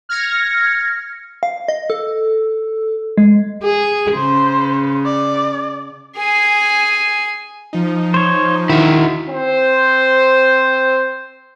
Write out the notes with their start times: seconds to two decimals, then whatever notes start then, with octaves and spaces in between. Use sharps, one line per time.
0.09 F6 G#6 A#6 C#7
1.43 F5
1.68 D#5
1.90 A4
3.17 G#3
3.63 G#4
4.15 C#3 C5
5.06 D5
6.17 G#4 G#5
7.73 F3 D#4
8.14 C5 C#5
8.70 D#3 E4 F#4
9.29 C4 C5